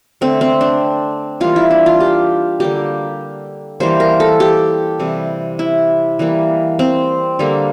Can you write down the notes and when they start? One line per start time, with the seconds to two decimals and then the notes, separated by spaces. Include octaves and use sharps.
0.21 D3 A3 C4
0.41 C4
0.61 D4
1.40 E3 G3 A#3 F4
1.56 E4
1.71 D4
1.86 F4
2.00 G4
2.60 D3 G3 A#3 G4
3.80 E3 G3 A#3 C5
4.00 A#4
4.20 A4
4.40 G4
4.99 C3 E3 G3
5.59 E4
6.19 E3 G3 A#3
6.79 C4
7.39 D3 G3 A#3